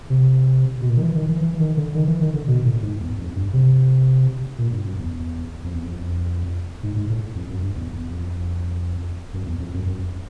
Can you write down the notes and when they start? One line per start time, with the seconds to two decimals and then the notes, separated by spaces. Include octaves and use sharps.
0.10 C3
0.81 B2
0.89 A#2
0.97 D#3
1.02 E3
1.15 D#3
1.28 E3
1.42 E3
1.60 D#3
1.77 D3
1.94 D#3
2.07 E3
2.21 D#3
2.34 D3
2.47 B2
2.64 A2
2.83 G#2
3.00 E2
3.18 F2
3.35 G2
3.53 C3
4.58 A#2
4.72 G2
4.85 F#2
4.98 E2
5.64 F2
5.74 E2
5.84 F2
6.83 G#2
6.96 G#2
7.10 A2
7.36 F2
7.49 F#2
7.62 G2
7.75 E2
7.93 E2
8.10 F2
9.34 F#2
9.47 E2
9.60 F2
9.74 F#2
9.86 F#2